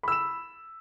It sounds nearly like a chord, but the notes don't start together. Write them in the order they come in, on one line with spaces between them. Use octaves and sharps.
B5 E6 E7